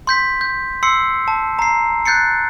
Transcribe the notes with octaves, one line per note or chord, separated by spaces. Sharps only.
C6 G6 B6
G6
C6 E6 C7 C#7
A5
A#5 C7
F#6 G6 A6 C7 C#7